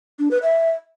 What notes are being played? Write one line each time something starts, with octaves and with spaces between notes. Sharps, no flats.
D4
B4
E5